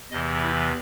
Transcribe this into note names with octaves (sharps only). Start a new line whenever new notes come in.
E2 C3 E3 D#5
E4